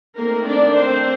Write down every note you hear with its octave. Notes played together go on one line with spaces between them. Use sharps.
D#3 A3 A#3 C4 A#4
D4 D5
C4 C5